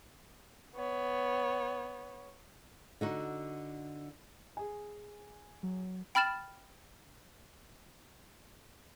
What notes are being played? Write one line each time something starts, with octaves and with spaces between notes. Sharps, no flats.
B3 C#5
D3 D#4 F#4
G#4 G#5
F#3
G5 B5 F6 A6 E7